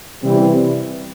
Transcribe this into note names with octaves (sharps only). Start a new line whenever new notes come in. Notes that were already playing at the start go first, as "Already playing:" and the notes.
C3 E3 G3 C4